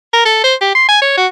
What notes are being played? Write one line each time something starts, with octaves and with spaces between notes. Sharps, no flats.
A#4
A4
C5
G4
C6
G#5
C#5
F#4